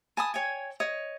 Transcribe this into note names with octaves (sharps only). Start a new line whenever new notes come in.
G#5 A5 B5 D#6
C#5 G5 G#5
C#5 D#5